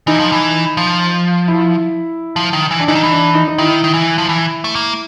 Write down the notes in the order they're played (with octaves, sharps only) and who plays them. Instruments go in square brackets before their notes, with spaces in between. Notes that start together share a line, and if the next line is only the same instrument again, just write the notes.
[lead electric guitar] E3 [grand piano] D#4
[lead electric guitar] F3
E3
F3
[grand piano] E4
[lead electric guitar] F3
D#3
E3
[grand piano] D4
[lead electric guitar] E3 [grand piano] D#4
[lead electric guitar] D#3
E3
[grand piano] D4
D#4
D#4
[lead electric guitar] D#3 [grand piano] E4
[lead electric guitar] D#3
E3
F3
E3
A3
A#3